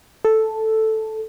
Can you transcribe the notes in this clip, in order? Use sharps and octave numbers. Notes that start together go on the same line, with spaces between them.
A4